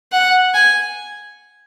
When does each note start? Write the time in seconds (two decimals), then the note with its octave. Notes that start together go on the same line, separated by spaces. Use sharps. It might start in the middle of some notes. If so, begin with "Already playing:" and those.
0.12 F#5
0.54 G#5